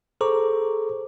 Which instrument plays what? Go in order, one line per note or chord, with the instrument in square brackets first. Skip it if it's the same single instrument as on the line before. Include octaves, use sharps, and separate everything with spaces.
[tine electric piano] G#4 A4 C5 A#5 C#6 D6